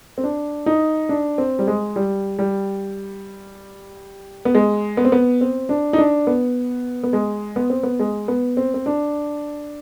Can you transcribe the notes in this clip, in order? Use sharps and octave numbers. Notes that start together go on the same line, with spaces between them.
C4
D4
D#4
D4
C4
G3
G#3
G3
G3
B3
G#3
B3
C4
B3
C4
D4
D#4
D4
B3
B3
G#3
B3
C4
B3
G#3
B3
C4
C4
D4